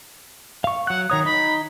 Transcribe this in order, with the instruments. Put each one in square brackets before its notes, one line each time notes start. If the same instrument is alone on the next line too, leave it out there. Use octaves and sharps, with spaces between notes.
[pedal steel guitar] F5 C#6
[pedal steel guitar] F#3 F#6 [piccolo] F#5
[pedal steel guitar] D#3 C#5 D#6 [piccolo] A#5
[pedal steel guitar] D#4 [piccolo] B5